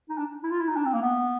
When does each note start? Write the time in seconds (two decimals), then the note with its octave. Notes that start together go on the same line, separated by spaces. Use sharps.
0.09 D#4
0.18 D4
0.43 E4
0.51 F4
0.59 E4
0.68 D#4
0.76 D4
0.85 C4
0.94 A#3
1.02 B3